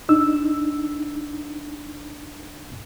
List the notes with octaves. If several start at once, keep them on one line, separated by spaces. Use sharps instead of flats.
D4 D#4 E6